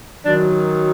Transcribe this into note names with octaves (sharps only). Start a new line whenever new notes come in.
F#2 D#3 F#3 D4